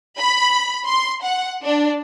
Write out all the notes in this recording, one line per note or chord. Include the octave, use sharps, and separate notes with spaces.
B5
C6
F#5
D4